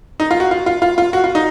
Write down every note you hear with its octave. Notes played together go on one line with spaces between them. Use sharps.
D#4
F4
F#4
F4
F4
F4
F4
F#4
F4
D#4